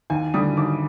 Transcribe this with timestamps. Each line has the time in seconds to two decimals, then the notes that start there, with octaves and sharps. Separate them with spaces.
0.10 D#2 G#5
0.34 D3 G3 D#6
0.57 D#2 D6